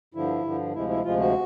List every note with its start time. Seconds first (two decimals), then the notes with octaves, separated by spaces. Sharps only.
0.14 G2 D3 F3 E4
0.44 G2 D3 F3
0.74 D2 C3 F3 G#3 E4
0.89 E4
1.04 D2 C3 F3 G#3 F4
1.20 F#4